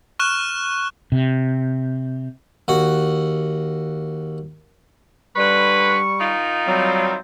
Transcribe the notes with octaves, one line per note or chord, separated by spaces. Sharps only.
C#6 F6 F#6 E7 G7
C3
D#2 F#4 F#5
D3 G3 B4 C#6
D#3 D#4 F4
F#3 G3 C4